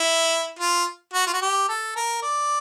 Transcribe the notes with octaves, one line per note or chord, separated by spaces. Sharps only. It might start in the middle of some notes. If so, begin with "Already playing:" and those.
Already playing: E4
F4
F#4
F4
F#4
G4
A4
A#4
D5